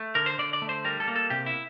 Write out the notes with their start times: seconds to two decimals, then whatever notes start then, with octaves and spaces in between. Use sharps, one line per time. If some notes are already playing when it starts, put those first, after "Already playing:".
Already playing: A3
0.15 D3 A#4
0.26 C5
0.38 D3 D5
0.53 D5
0.62 A3
0.69 C5
0.85 G3 A#4
1.00 A4
1.08 A#3
1.16 A4
1.30 C3 G4
1.46 E4